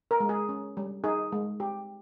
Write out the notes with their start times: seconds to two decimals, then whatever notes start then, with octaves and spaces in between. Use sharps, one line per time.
0.11 A#4
0.20 G#3
0.29 G#4
0.49 C#4
0.77 G3
1.04 D#4 G#4
1.32 G#3
1.60 G4